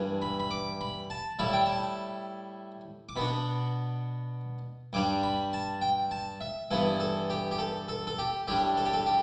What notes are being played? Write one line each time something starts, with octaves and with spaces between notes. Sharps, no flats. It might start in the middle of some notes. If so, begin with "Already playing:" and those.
Already playing: G2 E3 G3 D4
B5
B5
D6
B5
A5
A2 G3 E4 A5
G5
A5
D6
B2 B3 D4 B5
G2 G3 D4 D6
B5
A5
G5
A5
E5
G2 E3 B3 E4 A4
A4
G4
G4
A4
A4
A4
G4
A2 G3 D4 G4
A4
G4
A4
G4